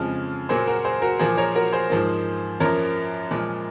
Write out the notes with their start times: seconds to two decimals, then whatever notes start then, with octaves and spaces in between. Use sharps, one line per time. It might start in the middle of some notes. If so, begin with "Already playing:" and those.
Already playing: F2 C#3 F3 G#3
0.49 A#2 F#3 A#3 G#4 C5
0.67 F#4 A#4
0.84 G#4 C5
1.02 F#4 A#4
1.19 A#2 F3 A#3 G#4 C5
1.38 A#4 C#5
1.55 F#4 A#4
1.72 G#4 C5
1.90 G#2 F3 A#3
2.60 F#2 F3 A#3 A#4 C#5
3.31 A#2 F3 G#3